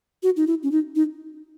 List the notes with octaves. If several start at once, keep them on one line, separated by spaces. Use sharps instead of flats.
F#4
D#4
E4
C#4
D#4
D#4